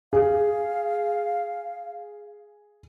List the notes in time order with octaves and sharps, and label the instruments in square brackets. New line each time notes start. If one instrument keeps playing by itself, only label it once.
[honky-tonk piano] G#4 [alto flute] F5